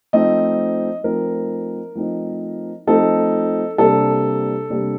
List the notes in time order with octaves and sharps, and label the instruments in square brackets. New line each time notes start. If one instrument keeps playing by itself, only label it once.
[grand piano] F3 A3 C4 D#4 D#5
F3 A3 C4 D#4 A#4
F3 A3 C4 D#4
F3 A3 C4 D#4 A4
C3 G3 A#3 D4 A4
C3 G3 A#3 D4